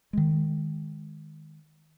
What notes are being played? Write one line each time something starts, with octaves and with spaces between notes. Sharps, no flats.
D#3 G#3